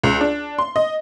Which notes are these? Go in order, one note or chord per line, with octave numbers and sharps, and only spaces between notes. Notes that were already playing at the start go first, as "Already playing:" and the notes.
C#2
D4
C6
D#5